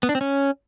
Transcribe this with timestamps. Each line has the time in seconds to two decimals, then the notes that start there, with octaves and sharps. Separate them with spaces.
0.03 B3
0.09 D4
0.15 C4
0.21 C#4